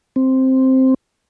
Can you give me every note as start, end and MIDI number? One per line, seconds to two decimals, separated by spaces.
0.16 0.94 60